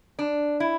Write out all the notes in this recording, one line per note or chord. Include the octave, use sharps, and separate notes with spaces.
D4
E4